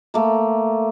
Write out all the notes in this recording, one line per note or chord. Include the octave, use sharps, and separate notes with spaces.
A3 A#3